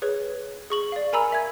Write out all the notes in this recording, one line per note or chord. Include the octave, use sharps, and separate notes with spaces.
G#4 B4 C#5
G#4 C#6 F#7
D5 F5
A#4 G#5 A#5 B5 E6
E5 G#6